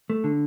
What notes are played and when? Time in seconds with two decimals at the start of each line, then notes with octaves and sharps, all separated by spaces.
0.10 A3
0.24 D3